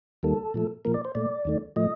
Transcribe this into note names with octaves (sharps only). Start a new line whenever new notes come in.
D#2 D#3 G3 A#3 A4
A#2 F3 A3
A#2 F3 A#3 A#4
D5
C5
A#2 A3 D5
D#2 D#3 A3
A2 F3 A3 D#5